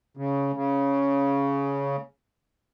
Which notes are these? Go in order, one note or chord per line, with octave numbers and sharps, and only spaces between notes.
C#3
C#3